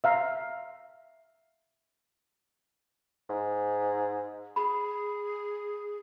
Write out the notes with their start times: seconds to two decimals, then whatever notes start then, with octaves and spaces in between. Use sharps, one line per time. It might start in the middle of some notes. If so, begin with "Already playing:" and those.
0.04 E5 F5 A#5
3.30 G#2
4.56 G#4 B5